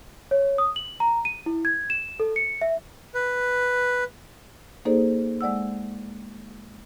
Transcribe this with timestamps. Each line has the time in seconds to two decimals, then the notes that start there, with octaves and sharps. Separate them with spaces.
0.31 C#5
0.58 D#6
0.76 F#7
1.00 A#5
1.25 D#7
1.46 E4
1.65 G#6
1.90 E7
2.20 A4
2.36 C#7
2.61 E5
3.15 B4
4.85 A#3 D#4 G#4 A4 C5 D5
5.41 G#3 D5 F#5 E6